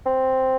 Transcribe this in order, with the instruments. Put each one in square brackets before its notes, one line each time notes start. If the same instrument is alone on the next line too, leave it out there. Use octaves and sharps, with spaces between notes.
[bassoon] C4